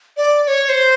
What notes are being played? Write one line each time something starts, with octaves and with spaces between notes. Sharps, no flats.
D5
D5
C#5
C5